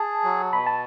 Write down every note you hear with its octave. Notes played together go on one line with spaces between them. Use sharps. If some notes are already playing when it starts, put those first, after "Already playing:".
Already playing: G#4 A5
F#3
B2 B5
A5